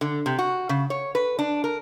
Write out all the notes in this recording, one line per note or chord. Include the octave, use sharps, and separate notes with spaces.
D3
C3
F#4
C#3
C#5
B4
D4
A#4